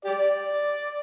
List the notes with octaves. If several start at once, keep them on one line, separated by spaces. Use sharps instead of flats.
G4 D5